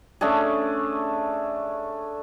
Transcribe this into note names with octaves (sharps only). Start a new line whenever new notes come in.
A3 C#4 D4 G#4